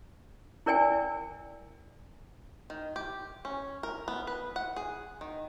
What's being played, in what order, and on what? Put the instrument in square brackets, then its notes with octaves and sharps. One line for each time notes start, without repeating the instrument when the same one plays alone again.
[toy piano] E4 A#4 D5 G5 G#5
[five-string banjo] D#3
G4
C#4
A#4
B3
B4
F#5
G#4
D#3